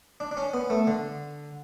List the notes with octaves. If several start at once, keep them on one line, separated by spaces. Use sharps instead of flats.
D4
D4
C#4
B3
A3
D3